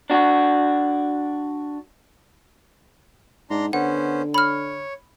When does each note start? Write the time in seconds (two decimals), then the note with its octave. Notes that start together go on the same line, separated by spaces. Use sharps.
0.10 D4 F#4
3.50 G#2 D4 A#5 C6
3.73 D3 B3 C#4 C5 F#5
4.34 C#5 B5 F6